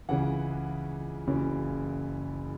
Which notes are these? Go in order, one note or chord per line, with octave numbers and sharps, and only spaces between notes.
C#2 C#3 E3 F#5
F#1 F#2 C#3 E3